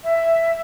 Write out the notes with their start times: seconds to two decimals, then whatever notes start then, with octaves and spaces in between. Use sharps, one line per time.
0.04 E5